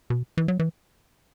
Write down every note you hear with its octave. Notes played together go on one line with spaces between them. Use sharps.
B2
E3
F#3
E3